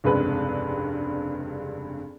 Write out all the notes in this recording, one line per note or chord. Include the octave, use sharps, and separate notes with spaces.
F1 C#2 G2 G#3 C4 B4